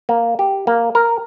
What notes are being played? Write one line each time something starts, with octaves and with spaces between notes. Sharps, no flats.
A#3
G4
A#3
A#4